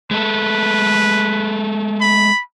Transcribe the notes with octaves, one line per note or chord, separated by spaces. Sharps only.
G#3 A3 A4 B4
B5